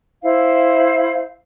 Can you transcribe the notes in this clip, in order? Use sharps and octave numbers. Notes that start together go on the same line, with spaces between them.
E4 C5 F5